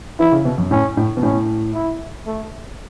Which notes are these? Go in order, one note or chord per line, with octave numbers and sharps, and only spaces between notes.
E3 E4
C#3
B2
F#2
A2 C#4
A2
B2
A2 C#4
E4
A3